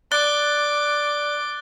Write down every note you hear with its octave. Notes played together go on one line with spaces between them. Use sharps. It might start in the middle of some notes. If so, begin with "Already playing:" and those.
D5 D6 F#6 A6 G7